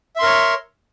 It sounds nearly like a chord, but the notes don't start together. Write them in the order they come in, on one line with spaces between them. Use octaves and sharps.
E5 C6 A#4 C#5